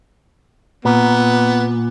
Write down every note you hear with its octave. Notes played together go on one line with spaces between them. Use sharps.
A#2 B3